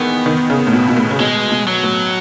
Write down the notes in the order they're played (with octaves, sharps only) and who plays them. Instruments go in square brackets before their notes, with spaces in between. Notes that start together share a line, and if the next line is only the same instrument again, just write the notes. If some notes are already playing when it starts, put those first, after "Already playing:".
Already playing: [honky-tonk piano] D#3 E3 G#3 [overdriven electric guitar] B3
[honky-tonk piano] D#3
C#3
A2
B2
B2
A2
C#3
[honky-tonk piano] B2 [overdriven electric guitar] G#3
[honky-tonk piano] B2
[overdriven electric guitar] F#3
[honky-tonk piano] A2